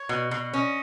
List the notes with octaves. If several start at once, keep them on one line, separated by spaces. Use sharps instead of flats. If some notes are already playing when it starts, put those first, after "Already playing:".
Already playing: C#5
B2
B2
C#4 D#5